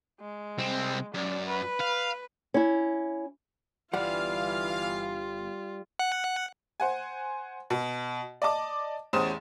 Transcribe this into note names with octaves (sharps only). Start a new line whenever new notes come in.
G#3
C2 C4
F#2 D5
B4
F5
C#4 E4
G1 E3 G3 F4 F5 F#5
F#5
C5 F#5 G#5
B2
D5 D#5 A5 D6
A1 E2 C#4 C5 D#6 E7